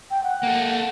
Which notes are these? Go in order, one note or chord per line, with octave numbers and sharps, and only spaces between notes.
G5
F#5
A#3 A4